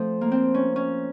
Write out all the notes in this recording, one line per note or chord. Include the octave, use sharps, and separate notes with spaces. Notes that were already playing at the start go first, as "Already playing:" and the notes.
Already playing: F3 A3 C4
A#3
C4
C#4
C#4